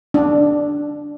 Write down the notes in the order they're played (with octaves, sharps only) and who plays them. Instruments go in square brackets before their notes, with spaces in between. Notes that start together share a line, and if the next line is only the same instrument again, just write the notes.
[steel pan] D4